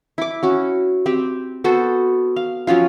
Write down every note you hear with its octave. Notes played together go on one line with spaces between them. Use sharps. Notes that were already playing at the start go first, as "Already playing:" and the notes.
E4 D6
C#4 F#4
C4 G4
B3 F#4 A4 C5
F5
F3 F#3 C#4 F4